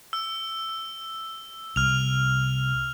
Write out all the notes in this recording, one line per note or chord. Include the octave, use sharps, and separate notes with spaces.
E6
C2 F6 F7